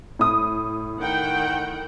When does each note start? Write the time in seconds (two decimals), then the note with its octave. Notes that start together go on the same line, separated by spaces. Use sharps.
0.19 A2 D#6
0.99 D#3 F#5 G5